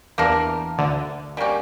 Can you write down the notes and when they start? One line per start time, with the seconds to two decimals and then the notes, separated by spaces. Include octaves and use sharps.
0.18 E2 E3 A#3 D4 G4 A#4
0.78 D2 D3
1.37 G3 A#3 C#4 G4